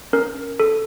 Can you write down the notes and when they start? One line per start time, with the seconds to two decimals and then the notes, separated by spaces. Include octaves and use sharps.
0.13 C#4 A#4
0.60 A4